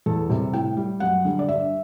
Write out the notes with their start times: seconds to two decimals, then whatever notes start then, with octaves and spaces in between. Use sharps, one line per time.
0.06 E2 A4
0.29 C3 G3
0.53 A2 G5
0.77 G3
1.00 F#2 F#5
1.25 D3 G3
1.39 D5
1.48 G2 E5